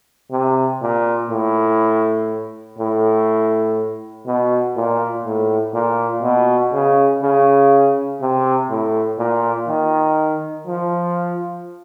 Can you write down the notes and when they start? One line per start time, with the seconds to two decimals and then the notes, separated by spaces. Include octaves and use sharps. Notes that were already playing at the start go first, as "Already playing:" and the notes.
0.31 C3
0.82 A#2
1.30 A2
2.78 A2
4.26 B2
4.76 A#2
5.25 A2
5.74 A#2
6.23 B2
6.73 C#3
7.22 C#3
8.21 C3
8.70 A2
9.19 A#2
9.68 D#3
10.67 F3